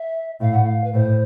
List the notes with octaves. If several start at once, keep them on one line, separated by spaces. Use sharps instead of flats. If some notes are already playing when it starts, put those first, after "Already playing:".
Already playing: E5
A2 F5
F#5
F5
B4
A2 C5